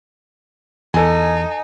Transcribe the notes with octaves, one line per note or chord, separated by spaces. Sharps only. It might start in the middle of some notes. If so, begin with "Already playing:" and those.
E2 D#4 A4 G#5